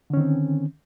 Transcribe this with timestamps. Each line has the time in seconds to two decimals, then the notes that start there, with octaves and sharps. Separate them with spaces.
0.10 D3
0.14 C#4
0.17 D#3
0.20 C4